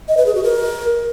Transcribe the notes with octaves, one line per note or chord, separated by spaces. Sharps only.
D#5
B4
G#4
F#4
A#4